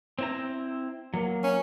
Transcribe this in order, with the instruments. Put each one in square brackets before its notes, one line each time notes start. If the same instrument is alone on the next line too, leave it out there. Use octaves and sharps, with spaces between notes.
[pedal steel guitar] C4 E4 A#5
F#3 A#3
[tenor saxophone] C#4